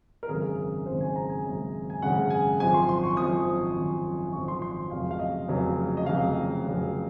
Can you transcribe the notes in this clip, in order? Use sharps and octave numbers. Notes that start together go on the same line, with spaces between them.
A#4
G#1 F#2 C#3 G#3 G#4
G#1 F#2 C#3 G#3 C5
G#5
A#5
G#5
G#1 F#2 C#3 G#3
G#5
G#1 F#2 C#3 G#3 F#5
G#5
G#1 F#2 F3 G#5
C6
C6
C#6
G#1 F#2 F3 D#6
G#1 F#2 F3
G#1 F#2 F3 C#6
C6
C6
F1 F2 C#3 F#3 F5
F5
D#5
F1 F2 C#3 F#3
D#5
F1 F2 C#3 F#3 F5
F1 F2 C#3 F#3